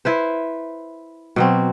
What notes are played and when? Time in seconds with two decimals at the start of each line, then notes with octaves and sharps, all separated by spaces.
0.05 E4 B4 C5
1.36 B2 F#3 C4